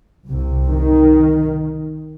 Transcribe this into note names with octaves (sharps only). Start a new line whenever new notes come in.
C2 C3
D#3